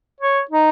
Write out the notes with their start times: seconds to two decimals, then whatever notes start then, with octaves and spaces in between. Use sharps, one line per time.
0.20 C#5
0.50 D#4